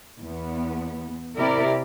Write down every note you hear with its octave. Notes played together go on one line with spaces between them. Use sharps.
E2 B3
C3 E4 G4 A#4 D5 E5